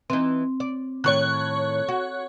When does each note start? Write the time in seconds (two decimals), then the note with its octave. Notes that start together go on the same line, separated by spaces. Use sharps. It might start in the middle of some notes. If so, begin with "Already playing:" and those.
0.10 E3 C4 D#4
0.60 D5
1.04 A2 D#3 C#5 C#6 F#6
1.88 F#4